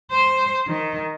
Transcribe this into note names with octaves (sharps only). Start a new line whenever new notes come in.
C5
D#3